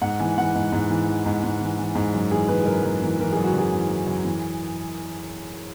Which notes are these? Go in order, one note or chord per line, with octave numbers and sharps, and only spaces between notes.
G#2 F#5
E3 G#5
E3 F#5
G#2
G#2
E3
E3
G#2
G#2
E3
E3
G#2
F#2
E3 G#4
E3 B4
G#4
F#2 A#4
F#2
E3
E3 A#4
F#2 G#4
F#4
F#2 G#4
E3
E3
F#2
E3